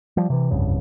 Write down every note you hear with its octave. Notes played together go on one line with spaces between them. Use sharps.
F3 G3
C3 E3
F1 C2 G2 C#3